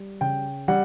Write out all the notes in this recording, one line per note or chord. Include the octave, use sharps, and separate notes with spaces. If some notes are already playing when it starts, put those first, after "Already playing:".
Already playing: G3
C#3 G5
G3 F#5